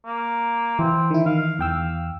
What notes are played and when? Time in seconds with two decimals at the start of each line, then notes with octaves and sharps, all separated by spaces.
0.06 A#3
0.79 E3 C4
1.10 D#3 E4
1.26 D#3 F5
1.59 E2 G5 E6